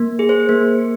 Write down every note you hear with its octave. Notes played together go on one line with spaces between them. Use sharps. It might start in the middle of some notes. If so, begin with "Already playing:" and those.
Already playing: A#3
G#4
C5
A#3